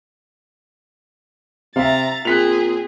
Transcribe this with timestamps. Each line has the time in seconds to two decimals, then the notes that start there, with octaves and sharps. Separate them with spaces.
1.76 C3 E5 F5 A#5 A6
2.25 A#2 C4 G#4 F#6 B6 F7